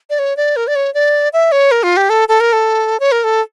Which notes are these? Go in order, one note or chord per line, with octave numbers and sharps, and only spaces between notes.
D5
C#5
D5
A#4
D5
C#5
D5
E5
C#5
A#4
F4
G4
A4
A4
A#4
A4
C#5
A#4
A4